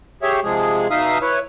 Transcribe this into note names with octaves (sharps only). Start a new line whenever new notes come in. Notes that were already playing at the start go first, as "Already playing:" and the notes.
G4 G#4 C#5 E5
C3 F3 G#3 G#4
B2 D#4 E5 F5 D#6
E4 B4 C#5